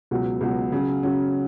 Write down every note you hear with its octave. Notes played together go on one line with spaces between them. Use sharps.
C#2 B2 F#3
C#2 B2 F#3
C#3 F#3 C#4
C#3 F#3 C#4